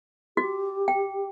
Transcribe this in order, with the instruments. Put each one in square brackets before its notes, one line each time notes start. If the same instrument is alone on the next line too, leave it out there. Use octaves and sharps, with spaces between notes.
[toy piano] F#4 [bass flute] G4
[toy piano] G5